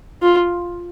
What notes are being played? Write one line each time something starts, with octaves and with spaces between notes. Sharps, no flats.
F4